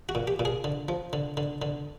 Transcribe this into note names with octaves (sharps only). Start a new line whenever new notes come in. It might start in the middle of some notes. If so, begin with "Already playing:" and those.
F#4
A#2
G4
A#2
G#4
D3
F3
D3
D3
D3